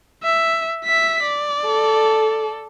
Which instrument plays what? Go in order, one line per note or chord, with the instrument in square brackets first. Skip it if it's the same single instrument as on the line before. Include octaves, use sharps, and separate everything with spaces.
[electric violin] E5
E5 B6
D5
[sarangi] A4